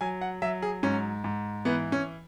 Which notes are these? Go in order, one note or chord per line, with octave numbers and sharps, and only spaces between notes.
F#3 G#5
F#5
F#3 E5
G#4
G#2 C#4
G#2
E3 B3
C#4